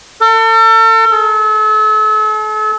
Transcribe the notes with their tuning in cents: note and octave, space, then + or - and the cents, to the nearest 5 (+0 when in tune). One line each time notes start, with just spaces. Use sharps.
A4 +40
A4 -40